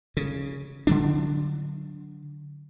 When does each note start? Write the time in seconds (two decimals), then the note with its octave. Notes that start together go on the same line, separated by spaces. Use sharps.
0.17 C#3
0.87 D3 F#3 D4